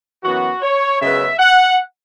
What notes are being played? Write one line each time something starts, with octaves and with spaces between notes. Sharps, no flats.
F#2 E3 B3 F#4
C#5
F#2 C#3 G#3 B3 E5
F#5